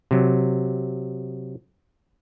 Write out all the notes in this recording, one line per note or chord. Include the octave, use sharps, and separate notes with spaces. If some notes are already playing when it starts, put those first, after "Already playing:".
C3 F#3